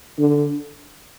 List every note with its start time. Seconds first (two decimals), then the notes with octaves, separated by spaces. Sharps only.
0.19 D3